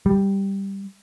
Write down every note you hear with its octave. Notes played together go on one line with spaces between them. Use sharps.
G3